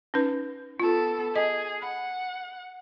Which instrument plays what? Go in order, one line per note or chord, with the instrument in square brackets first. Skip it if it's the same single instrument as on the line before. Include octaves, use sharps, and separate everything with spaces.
[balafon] C#4 D#4 B4
[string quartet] B3 A4 [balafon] F4
[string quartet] G#4 [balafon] D#5
[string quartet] F#5 [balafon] B5